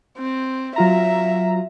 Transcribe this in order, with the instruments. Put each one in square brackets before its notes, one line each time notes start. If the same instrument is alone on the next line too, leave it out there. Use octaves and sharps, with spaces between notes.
[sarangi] C4
[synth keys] F#3 F4 A#5 [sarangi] E5